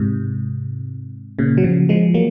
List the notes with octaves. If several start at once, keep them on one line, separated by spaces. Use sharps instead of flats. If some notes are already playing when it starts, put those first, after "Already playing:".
Already playing: G#2 C3
A#2 C#3
F#3
C#3 F3
F3 G#3
F#3 A#3